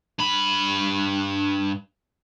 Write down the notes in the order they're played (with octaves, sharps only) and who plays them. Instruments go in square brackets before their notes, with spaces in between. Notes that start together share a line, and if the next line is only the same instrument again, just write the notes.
[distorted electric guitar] G2 B5